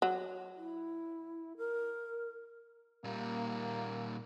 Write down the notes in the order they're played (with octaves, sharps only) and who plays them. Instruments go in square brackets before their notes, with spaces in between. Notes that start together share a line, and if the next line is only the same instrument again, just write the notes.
[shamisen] F#3
[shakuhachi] E4
A#4
[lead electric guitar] A#2 G3 [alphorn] A#3